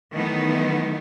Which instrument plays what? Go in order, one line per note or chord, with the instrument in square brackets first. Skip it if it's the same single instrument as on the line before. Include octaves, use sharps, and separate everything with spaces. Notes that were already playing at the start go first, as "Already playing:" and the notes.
[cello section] D#3 E3 F#3 A3 B3 D#4